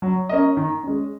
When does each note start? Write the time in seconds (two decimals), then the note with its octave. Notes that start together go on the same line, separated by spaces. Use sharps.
0.02 F#3
0.29 C#4 A#4 D#5
0.57 D#3
0.83 G#3 C#4